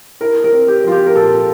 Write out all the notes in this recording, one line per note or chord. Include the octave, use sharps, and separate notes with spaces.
E4 A#4
A#4
C4
G4
F3 F4
G4
A#4
A#2 A4